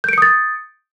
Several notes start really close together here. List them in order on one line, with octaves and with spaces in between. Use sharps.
G6 D7 C#7 D#6 A6